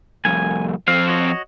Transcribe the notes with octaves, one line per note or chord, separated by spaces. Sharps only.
C2 F2 G#5
F3 C4 F5
F#4 C#5 D#5